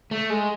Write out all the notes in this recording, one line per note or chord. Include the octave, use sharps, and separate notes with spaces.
A3
G#3